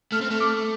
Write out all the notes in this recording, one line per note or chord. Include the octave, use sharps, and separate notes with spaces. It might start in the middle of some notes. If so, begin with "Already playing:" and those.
A3 F6
C4
A3 F6
D6